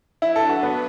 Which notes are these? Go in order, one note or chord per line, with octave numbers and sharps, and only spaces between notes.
F#3 D4 E4 B4
A4
F#4
B3